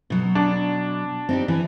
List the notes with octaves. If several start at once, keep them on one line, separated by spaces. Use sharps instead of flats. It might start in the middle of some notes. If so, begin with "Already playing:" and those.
B2 F#3
D4
C4 D#4 G4
E3